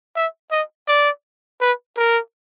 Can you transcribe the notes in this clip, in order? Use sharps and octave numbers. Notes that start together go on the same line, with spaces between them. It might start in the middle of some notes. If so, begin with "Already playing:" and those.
E5
D#5
D5
B4
A#4